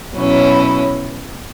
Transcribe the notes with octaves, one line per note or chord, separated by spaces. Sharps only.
B2 F#3 C#4 E4